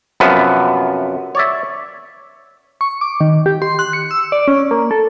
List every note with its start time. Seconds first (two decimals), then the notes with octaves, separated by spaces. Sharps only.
0.20 F#2 C3 F3 B3
1.35 C#5 D5 E5
2.81 C#6
3.01 D6
3.21 D#3
3.46 G4
3.62 C6
3.79 F#6
3.93 C#7
4.11 E6
4.32 D5
4.48 C#4
4.71 A#3
4.91 A4